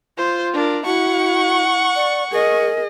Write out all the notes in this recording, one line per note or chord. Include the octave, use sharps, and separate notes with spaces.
F4 C5
D4 A#4
E4 F#4 F#5 C#6
D5
G#4 A#4 D#5